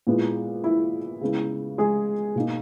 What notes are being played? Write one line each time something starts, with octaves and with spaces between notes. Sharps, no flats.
A#2 G#3 B3 E4
E4
C#3 G#3 B3 E4
G#3 G#4
B2 A#3 D#4